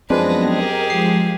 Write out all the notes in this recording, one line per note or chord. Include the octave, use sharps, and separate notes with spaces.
F#2 F3 G#3 B3 C4 D4 B4 A#6
G4 G#4 A#4 D#5
F3 G#3 C7